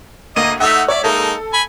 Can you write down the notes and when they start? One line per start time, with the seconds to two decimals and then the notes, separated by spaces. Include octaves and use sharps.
0.36 D2 A#3 D#5 D#7
0.60 A3 D#4 E5 F#5 E6
0.88 C#5 D5 E5
1.04 G#3 A#3 D#4 A4
1.53 G#5 B5